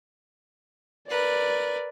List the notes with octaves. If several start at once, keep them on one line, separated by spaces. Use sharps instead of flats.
A#4 B4 D5